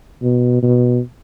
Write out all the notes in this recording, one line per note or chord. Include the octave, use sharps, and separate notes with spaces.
B2
B2